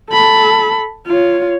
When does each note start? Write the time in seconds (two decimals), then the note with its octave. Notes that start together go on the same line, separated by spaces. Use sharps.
0.10 A4 B5
1.07 F4 C#5